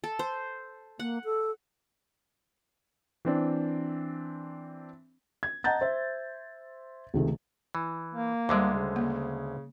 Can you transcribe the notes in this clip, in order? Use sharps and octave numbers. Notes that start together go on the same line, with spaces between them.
A4
C5
A#3 F#5
A4
E3 C4 D4
G#6
D#5 F#5 A5 A#5 G6 A6
C5 E5
C#2 C3 D#3 A3
E3
A#3
D2 D3 G3 G#3 D6
C#3
A#3